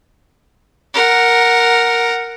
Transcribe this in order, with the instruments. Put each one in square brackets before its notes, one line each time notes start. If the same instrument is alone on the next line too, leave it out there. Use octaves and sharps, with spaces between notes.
[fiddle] A#4 F#5